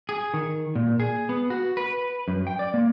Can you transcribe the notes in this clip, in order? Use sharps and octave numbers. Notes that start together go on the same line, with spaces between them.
G#4
D#3
A#2
G#4
B3
F#4
B4
F#2
G5
D5
A#3